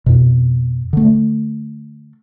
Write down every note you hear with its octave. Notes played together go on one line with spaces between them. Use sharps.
F2 B2
D3 A3